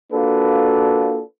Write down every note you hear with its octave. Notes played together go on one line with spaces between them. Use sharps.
A#3 D4 F4 F#4 A4 B4